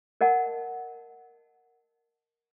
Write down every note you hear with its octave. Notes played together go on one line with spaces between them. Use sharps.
A#4 D#5 F#5 A5